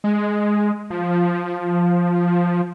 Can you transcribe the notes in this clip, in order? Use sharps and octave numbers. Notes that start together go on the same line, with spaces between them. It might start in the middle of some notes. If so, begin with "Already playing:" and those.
G#3
F3